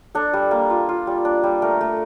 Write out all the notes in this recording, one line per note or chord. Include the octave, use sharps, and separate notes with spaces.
D4 A4
G3
A#3
F4
F4
G3
D4
G3
A3 A#4
A3